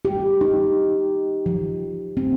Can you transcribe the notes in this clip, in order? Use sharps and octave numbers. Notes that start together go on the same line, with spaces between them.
G4
D#4
F3
C4